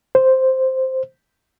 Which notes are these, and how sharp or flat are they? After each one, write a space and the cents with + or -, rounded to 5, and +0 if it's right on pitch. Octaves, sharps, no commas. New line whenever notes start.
C5 +0